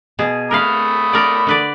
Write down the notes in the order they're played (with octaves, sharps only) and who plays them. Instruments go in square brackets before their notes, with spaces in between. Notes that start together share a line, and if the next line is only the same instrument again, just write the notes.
[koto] B2 G#4
[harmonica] A3 B5 D#6 [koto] A#4 B4 F5
[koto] A#4 D5
D3 B4 D5